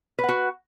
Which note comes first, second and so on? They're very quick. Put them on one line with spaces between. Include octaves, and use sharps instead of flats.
B4 F#5 F#4